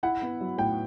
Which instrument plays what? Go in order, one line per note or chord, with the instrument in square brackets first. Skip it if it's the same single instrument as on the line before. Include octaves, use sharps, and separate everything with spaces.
[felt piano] E4 [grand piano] F#5
[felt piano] B3
F#3
[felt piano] A2 [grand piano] G5